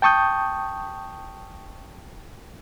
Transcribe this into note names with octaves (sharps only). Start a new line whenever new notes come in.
G5 A5 C#6 D#6 G6